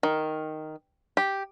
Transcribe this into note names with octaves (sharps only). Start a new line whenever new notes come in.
D#3
G4